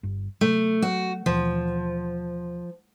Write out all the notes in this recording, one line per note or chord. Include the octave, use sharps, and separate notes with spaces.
G1 G2
C3 F#3 A3
F#3 F#4
D#2 B2 E3 F3